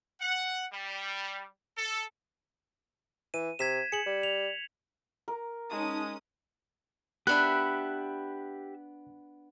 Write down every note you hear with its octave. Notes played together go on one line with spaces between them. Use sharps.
F#5
G3
A4
E3 D#7
C3 G#6 B6 E7
G#4 C#7 F#7
G3
F7
A#4
G#3 C#4 D#4 A5 D#6
B3 D4 G4 B4 E5 F#6